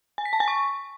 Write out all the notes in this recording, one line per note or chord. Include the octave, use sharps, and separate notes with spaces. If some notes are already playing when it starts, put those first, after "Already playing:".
G#5
B6
A5
G#5
C#6